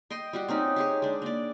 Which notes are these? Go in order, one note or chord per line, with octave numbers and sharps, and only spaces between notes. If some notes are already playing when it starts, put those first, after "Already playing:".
D#5 G5 C6
G3 F#4 G4
C4 C#4 D#4
G4 G#4 C#5
G#3 D4
A#3 D5